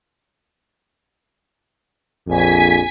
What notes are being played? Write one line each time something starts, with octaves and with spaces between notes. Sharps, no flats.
A#1 F2 G#5 B6